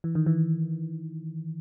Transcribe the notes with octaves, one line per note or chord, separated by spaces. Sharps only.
E3
D#3
E3